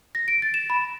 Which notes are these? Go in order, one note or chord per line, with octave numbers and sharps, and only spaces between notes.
A#6
D7
A6
E7
B5